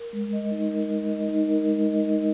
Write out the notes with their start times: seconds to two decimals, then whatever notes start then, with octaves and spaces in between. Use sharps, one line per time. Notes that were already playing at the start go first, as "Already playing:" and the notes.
Already playing: A#4
0.13 G#3
0.33 D#5
0.51 D#4
0.71 A#4
0.90 G#3
1.09 D#5
1.28 D#4
1.48 A#4
1.67 G#3
1.86 D#5
2.06 D#4